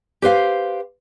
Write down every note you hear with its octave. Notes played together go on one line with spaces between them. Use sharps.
G4 B4 C5 F5